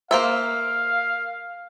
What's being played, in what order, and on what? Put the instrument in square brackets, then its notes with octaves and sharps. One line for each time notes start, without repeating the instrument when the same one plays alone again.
[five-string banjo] A#3 C5 E5 [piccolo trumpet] F5